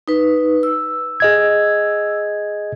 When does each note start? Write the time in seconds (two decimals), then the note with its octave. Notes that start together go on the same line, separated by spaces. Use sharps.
0.08 D#4 B4
0.63 E6
1.20 G#4 D#5 G#6